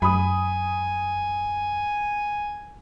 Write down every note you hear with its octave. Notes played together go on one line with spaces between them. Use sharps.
F#2 G#5 B5 D#6